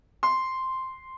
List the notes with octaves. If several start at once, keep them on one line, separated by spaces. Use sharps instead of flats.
C6